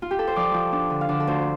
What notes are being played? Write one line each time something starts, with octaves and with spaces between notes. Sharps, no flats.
F4
G4
A4
C5
F3 D5
F3
D4
D3
F5
D3 D5
A4
D2 C5